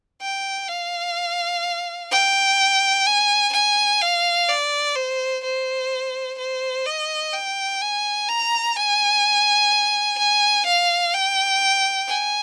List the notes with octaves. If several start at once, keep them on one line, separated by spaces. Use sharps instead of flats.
G5
F5
G5
G#5
G#5
F5
D5
C5
C5
C5
D#5
G5
G#5
A#5
G#5
G#5
F5
G5
G#5